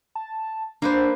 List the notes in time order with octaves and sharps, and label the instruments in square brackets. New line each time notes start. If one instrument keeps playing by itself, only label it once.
[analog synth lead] A5
[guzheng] A#3 B4 C5 [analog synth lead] D4